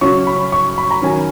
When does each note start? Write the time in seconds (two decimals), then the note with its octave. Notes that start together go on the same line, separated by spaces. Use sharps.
0.01 C#3 F#3 C#4 C#6
0.27 B5
0.52 C#6
0.78 B5
0.91 A#5
1.02 D#3 F#3 C#4 G#5